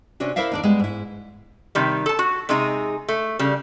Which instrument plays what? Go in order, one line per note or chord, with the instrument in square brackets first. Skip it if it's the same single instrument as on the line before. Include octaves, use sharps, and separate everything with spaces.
[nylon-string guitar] C3 C#4 D4 F#4
E4 A#4 C5 D5 E5 F5
D#2 D4 D5
G3 G#3 B3
G#2 E4
[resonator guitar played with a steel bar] C3 D#3 G3
A4 A5
F#4
C3 G#3 D#4 G#4
A3
C#3 G3